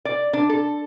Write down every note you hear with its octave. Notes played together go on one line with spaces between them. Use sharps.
D5
D4
A4